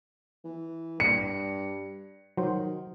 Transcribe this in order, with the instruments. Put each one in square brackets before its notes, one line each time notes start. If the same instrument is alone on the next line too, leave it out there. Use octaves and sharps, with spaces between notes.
[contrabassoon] E3
[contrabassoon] G2 [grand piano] C#7
[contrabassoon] D#3 [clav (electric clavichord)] F#3 C5